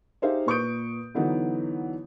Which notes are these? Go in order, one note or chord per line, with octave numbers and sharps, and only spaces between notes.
D#4 G4 G#4 C5 E5 F5
A#2 B4 C#6 D#6 G6 D7
D3 E3 F#3 B3 D#4